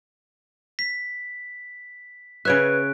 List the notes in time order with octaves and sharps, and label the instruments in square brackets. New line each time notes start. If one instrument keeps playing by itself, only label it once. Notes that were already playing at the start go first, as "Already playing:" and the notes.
[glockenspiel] B6
[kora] C#3 C#5 E5 [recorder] B4 [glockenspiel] F#6 D7